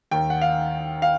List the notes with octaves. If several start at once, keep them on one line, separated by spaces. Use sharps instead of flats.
D#2 D#3 G5
F#5
F5
F5